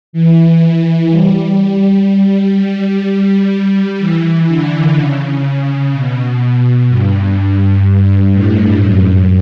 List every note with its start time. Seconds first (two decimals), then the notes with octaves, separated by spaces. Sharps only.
0.13 E3
1.10 G3
2.55 G3
4.00 E3
4.48 D3
4.95 C#3
5.93 B2
6.89 G2
8.34 A2
8.82 F#2